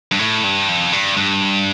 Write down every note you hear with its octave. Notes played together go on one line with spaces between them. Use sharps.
G2
A2
G2
F2
G2
G2